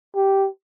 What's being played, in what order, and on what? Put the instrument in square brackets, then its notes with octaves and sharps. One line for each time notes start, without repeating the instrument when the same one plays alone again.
[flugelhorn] G4